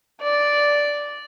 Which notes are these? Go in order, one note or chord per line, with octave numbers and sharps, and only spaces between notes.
D5